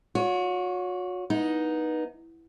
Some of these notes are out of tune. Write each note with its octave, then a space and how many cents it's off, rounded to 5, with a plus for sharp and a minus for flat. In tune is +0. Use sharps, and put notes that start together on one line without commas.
F#4 -40 C#5 +25
B3 -25 D#4 +0